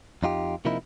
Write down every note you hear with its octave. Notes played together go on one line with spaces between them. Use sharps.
F2 D#4 F4 G4
C3 F3 A#3 D#4 E4